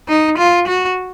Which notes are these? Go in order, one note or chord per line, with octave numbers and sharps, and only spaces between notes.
D#4
F4
F#4